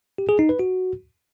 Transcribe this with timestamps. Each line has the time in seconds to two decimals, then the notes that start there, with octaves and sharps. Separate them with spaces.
0.18 G4
0.29 G#4
0.39 D#4
0.49 B4
0.59 F#4